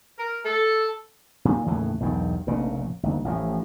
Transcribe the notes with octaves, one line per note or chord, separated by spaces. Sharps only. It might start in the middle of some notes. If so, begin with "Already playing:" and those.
A#4
A4
A#2 D#3
D#2 A2 C#3 E3
B1 E2 G2 D#3
F1 A#1 A#2 C#3
G1 D#2
A1 A2 D3 F3